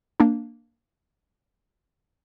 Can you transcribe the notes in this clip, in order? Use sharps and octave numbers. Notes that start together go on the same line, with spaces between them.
A#3 D4